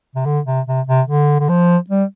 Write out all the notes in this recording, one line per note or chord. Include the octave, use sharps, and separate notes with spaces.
C3
D3
C3
C3
C3
D3
D3
F3
G3